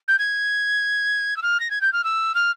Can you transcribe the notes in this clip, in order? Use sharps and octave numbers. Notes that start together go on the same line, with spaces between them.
G6
G#6
E6
F6
A#6
G#6
G6
F6
E6
F6